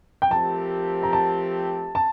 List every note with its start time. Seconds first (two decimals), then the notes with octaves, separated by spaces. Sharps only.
0.22 G5
0.31 F3 A3 C4 G4 A#4 A5
1.03 A#5
1.13 A5
1.95 A5